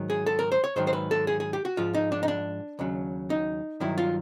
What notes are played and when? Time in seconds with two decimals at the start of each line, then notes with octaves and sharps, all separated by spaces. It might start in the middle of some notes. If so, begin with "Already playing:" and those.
Already playing: G#2 D#3 F#3
0.10 G#4
0.26 A4
0.39 A#4
0.52 C5
0.64 C#5
0.76 G#2 D#3 F#3 C5
0.87 C5
0.93 B4
1.11 A4
1.27 G#4
1.40 G#4
1.53 G4
1.65 F#4
1.77 G#2 F3 F4
1.94 D#4
2.12 D4
2.23 D#4
2.28 D4
2.79 D#2 C#3 F#3
3.30 D#4
3.80 G2 D#3 F#3 E4
3.98 F4